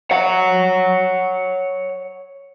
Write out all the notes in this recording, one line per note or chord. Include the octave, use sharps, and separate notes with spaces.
C#5 F#5